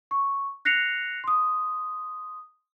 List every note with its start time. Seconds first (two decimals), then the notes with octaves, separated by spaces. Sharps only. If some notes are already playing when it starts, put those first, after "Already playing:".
0.11 C#6
0.65 F#6 A#6 C7 C#7 F7
1.24 C6 D#6